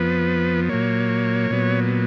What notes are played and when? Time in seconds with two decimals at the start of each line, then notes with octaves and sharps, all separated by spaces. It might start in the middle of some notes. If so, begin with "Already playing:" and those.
Already playing: F2 F3 B3 B4
0.69 A#2 F#3 A#3 C#5
1.50 A#2 F#3 B3